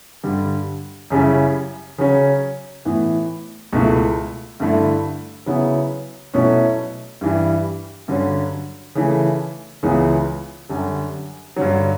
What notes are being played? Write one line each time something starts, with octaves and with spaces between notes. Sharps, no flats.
G2 D3 G3
F#2 C#3 G3 C#4 E4
C#3 F#3 C#4
A2 E3 B3
C#2 B2 A3 E4
G2 D3 A3 E4
C#3 F#3 B3 E4
B2 F#3 A3 C#4 E4
G2 E3 G3
G2 D3 F#3 C#4
C#3 E3 A3
C#2 C#3 E3 B3
F#2 D3 G3
G2 D3 F#3